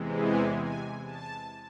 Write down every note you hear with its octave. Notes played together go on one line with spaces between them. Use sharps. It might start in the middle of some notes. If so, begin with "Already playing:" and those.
Already playing: E2 C3 E3 G#3
G#5
G#5
A5